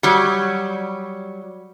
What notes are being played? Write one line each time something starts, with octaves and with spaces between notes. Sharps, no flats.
F#3 G3